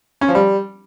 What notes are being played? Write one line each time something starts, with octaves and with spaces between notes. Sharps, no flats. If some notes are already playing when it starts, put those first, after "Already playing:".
C#4
F3
G3